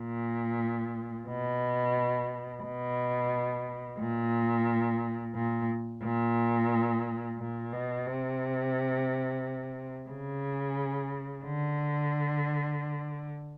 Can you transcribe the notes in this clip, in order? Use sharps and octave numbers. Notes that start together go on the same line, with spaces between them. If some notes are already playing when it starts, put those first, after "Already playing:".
Already playing: A#2
B2
B2
A#2
A#2
A#2
A#2
B2
C3
C#3
D3